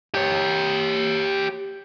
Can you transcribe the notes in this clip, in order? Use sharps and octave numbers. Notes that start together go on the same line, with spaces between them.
G4 C#5